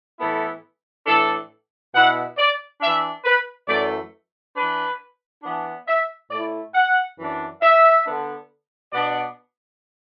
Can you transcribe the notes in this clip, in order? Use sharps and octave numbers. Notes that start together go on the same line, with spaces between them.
A2 E3 B3 E4 A4
A2 E3 D4 A4
B2 B3 E4 F#5
D5
E3 D4 E5
B4
F#2 E3 A3 D5
E3 D4 B4
E3 B3 D4
E5
A2 A3 E4 D5
F#5
F#2 E3 D4
E5
D3 B3 D4
B2 B3 D4 D5